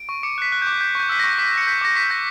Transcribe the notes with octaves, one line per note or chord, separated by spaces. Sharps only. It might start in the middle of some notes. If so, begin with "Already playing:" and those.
Already playing: D7
C#6
D6 C#7
F#6 B6
F#6
D6 G6
G6
C#6 G6
E6 B6
C#6 A#6
D6 B6
G6
C#7
G6 B6
D6 A#6
C#6 B6
G6 A#6